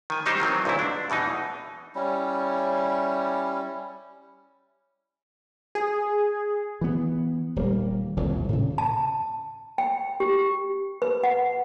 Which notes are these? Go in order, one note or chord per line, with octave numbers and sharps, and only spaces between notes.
D#3 G#5
F#3 G3 D#4 G4 C5
D#3 E3 F#3 C4
B1 A#2 D3 C4 E4
D4
E2 B2 E3 D#4
G3 C#4 E4
G#4
E3 B3
D#1 G3 A#3
D#1 C2 F2 D#3
A2 C#3
A5
G5
G4
B4
F#5